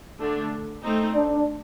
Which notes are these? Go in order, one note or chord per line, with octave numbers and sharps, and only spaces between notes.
D3 A3 D4
A3 C4 D#4
D4